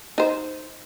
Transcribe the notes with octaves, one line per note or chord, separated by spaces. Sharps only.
D#4 C5